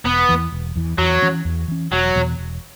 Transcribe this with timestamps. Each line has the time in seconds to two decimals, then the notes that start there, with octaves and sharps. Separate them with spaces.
0.04 E1 B3
0.29 E2 E3
0.52 E1
0.76 E2 E3
0.98 E2 F#3
1.22 E3 C#4
1.45 E2
1.68 E3 C#4
1.91 E1 F#3
2.15 E2 B2
2.38 E1